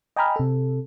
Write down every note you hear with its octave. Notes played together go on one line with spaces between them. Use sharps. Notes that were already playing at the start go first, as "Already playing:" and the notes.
D#5 G5 G#5 A#5 B5 F6
C3 A4